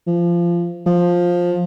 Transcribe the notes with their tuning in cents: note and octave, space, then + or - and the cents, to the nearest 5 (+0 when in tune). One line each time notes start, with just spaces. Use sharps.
F3 -20
F3 +10